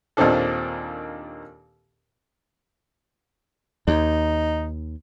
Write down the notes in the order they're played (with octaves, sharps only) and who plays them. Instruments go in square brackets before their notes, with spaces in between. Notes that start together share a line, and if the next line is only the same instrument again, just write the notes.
[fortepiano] D#2 A#2 D#3 C4 D4 A4
[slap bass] D#2 [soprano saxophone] D#4